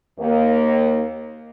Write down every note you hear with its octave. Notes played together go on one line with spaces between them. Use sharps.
D#2 A#3